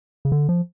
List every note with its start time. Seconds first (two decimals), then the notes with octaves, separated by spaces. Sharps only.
0.25 C#3
0.32 D3
0.49 F3